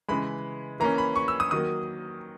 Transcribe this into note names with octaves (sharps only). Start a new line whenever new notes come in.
C#3 E3 G#3 B5
E3 A#3 C#4 A#5
B5
C#6
E6
D#6
D#3 F#3 A#3 D#6